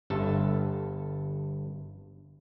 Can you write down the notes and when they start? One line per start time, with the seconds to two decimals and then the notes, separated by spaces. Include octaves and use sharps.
0.10 G1 G2 A4 E5 A5